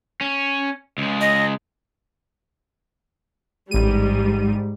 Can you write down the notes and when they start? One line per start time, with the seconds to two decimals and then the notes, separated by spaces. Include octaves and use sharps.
0.21 C#4
0.98 C#2 G#3
1.21 D#5
3.71 A1 G#2 G3 D#7